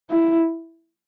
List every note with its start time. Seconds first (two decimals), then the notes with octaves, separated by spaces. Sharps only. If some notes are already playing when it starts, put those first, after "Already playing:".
0.10 E4